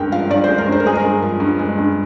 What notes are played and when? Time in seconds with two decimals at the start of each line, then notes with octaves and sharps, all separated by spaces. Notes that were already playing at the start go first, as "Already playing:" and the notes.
Already playing: G2 G#3 A#4 G5
0.12 F3 F5
0.30 G2 D5
0.44 G#3 C5
0.58 A#4
0.67 G2
0.72 C5
0.80 A#4
0.86 G#3 G#4
0.95 A#4
1.04 G2
1.22 F3
1.40 G2
1.59 G#3
1.78 G2